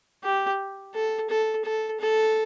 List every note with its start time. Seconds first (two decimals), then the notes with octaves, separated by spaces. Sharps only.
0.24 G4
0.95 A4
1.30 A4
1.65 A4
2.01 A4